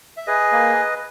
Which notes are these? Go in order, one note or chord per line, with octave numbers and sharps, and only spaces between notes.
E5
G#4 B4 D#5
A#3